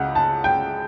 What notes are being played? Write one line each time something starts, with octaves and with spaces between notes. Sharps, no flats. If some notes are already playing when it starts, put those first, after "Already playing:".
Already playing: C#2 C#3 F#5
A5
G5